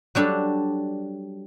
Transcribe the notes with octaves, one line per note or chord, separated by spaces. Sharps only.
F#3 G3 D4 A4